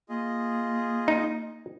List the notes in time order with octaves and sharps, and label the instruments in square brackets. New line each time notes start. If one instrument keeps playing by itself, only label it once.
[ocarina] A#3 [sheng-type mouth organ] F4 G#4 D#5
[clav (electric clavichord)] D#4